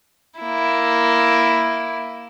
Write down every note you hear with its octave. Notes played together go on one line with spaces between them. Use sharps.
A#3 E4